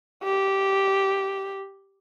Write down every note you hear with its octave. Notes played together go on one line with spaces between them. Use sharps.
G4